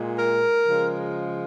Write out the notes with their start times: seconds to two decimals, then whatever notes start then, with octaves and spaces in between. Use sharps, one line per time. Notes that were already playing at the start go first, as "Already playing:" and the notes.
Already playing: A#2 G#3
0.16 A#4
0.67 C#3 F3 G#3